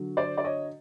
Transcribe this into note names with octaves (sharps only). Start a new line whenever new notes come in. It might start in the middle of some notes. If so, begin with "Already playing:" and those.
Already playing: D3 F#3
C5 D5
D5
C#5 D#5